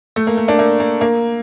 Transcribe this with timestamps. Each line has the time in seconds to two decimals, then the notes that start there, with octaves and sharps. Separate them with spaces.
0.16 A3
0.27 A#3
0.38 A#3
0.48 A#3 D4
0.59 A#3
0.80 A#3
1.01 A#3